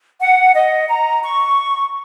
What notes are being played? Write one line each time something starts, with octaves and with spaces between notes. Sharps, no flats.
F#5
D#5
A#5
C#6